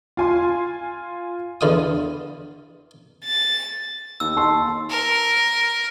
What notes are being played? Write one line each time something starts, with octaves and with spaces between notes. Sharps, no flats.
F4 G#5 C6
E2 D3 F5 D#6
A6
D#2 E6
A5 C6
A#4